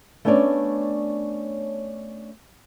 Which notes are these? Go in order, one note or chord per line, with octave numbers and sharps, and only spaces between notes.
A3 B3 C#4 D4 C#5 D5